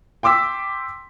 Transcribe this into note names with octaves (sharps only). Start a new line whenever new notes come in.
G5 C6 D6 E6 B6